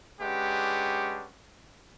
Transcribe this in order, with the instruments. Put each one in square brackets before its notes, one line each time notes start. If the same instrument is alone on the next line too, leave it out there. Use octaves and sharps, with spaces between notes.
[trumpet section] G#3 C#4 D4 G4 B4 F#5